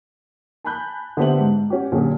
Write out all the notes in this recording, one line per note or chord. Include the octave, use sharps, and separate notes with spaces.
G#5 A5 B5 F#6 G6
D3 B3 G4 C5 E5 F#7
G#2
C#4 F#4 G4
A#2 D3 F#3 C#4 G4 G#4